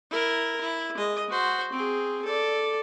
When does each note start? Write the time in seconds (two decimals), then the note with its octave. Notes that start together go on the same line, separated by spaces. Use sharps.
0.11 E4 A#4
0.61 E4
0.98 G#3 D#5
1.30 F#4 C5
1.73 C4 G#4
2.24 A4 D5